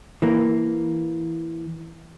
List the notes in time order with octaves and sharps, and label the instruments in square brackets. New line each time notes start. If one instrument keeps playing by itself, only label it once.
[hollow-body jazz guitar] E3 A#3